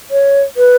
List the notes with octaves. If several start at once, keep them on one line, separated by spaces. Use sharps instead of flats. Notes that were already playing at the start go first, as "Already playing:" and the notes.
C#5
B4